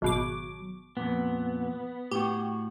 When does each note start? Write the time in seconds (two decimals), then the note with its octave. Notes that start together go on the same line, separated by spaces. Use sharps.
0.02 G#1 B2 F#3 D6
0.97 F2 A#2 B3
2.11 A2 F#4 G4